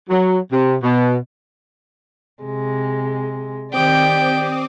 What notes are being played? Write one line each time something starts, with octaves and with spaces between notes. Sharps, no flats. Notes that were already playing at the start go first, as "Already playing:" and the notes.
F#3
C3
B2
C3 G#3
D#3 C4 G4 D5 G5 D6 D#6